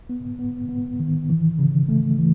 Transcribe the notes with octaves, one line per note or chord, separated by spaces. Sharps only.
B3
B3
B3
D#3
E3
C#3
A3
E3